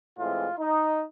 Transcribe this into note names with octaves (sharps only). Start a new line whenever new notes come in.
A2 E3 G#3 C4 F4
D#4